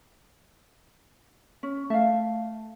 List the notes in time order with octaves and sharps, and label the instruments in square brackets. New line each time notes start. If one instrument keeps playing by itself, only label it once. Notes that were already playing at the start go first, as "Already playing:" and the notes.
[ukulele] C#4
[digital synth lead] A3 [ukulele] E5 F5